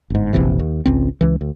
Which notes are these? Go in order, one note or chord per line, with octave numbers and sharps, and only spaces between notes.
G1 G#2
F1 A#1 C3 E3
D#2
G#1 C#2 C4
C#2 E3
D2